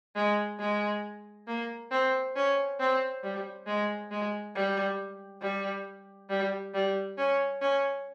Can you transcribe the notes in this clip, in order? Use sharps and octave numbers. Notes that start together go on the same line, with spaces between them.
G#3
G#3
A#3
C4
C#4
C4
G3
G#3
G#3
G3
G3
G3
G3
C#4
C#4